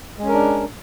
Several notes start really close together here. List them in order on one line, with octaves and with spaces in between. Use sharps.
G#3 C#4 A#4 D4